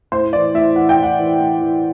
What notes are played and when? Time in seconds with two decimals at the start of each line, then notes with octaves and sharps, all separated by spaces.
0.12 A2 C5
0.33 E3 D5
0.54 A2 E5
0.75 E3 F#5
0.89 G5
0.98 A2 F#5
1.19 E3
1.40 A2
1.61 E3